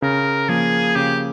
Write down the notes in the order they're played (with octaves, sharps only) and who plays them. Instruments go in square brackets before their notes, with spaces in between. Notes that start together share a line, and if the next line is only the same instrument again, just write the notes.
[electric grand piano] C#3 [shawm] A#4
[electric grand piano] F3 A#3 [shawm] G#4
[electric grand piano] C#3 [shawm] G4